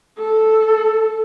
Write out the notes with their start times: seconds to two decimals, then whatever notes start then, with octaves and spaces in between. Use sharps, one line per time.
0.18 A4